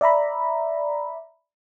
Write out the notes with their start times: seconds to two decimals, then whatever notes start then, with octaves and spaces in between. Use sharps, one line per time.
0.01 D5 E5 A#5 B5